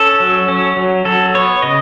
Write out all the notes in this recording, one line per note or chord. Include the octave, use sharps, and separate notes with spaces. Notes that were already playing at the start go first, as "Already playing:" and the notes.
Already playing: C#4 A4
F#3
C#4
F#3
F#3 A4
B3 C#5
C#3 D#5